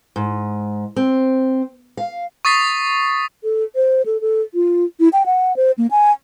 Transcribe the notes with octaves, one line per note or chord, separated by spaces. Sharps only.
G#2
C4
F5
C#6 D#6 A6 B6 C7
A4
C5
A4
A4
F4
E4
G5
F#5
C5
A#3
G#5